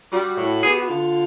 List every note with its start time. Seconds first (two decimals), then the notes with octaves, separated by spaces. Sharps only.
0.11 G3 F#4
0.37 A2
0.62 B3 G#4
0.70 G4
0.80 F#4
0.88 D3 F4